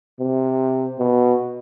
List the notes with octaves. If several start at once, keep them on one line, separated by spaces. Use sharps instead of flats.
C3
B2